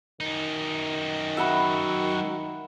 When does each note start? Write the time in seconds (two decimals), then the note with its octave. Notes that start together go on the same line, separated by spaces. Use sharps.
0.21 F#2 D#3 D#4
1.37 F#4 E5 F#5 B5